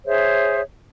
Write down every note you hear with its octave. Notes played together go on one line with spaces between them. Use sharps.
G#4 C5 C#5 E5